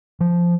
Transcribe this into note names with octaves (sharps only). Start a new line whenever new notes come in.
F3